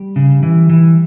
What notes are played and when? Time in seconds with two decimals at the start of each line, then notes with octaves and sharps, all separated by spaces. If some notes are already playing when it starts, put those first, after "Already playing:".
Already playing: G3 G4
0.16 C#3
0.43 E3
0.69 E3